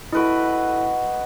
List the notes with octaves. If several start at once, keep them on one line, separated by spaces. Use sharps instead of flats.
E4 F#4 A4 B4 D#5